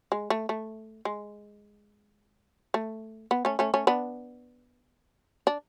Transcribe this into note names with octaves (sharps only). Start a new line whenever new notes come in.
G#3
A3
A3
G#3
A3
B3
A3 C#4
A3 C#4
A3 C#4
B3 D4
D4